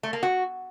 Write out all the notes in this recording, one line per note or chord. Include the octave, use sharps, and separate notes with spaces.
A3
A#3
F#4